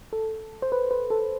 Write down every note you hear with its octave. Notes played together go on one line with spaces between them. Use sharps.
A4
C5
B4
B4
A4